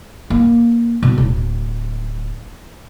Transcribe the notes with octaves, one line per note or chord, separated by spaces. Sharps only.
A#3
B2
D1